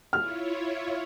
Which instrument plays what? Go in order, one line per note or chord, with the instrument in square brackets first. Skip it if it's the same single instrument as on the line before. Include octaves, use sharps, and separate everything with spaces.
[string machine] E4 F4 C#5 [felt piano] F6